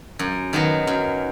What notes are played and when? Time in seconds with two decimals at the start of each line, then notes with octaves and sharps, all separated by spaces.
0.19 F#2
0.53 D#3 F#3 B3
0.87 F#2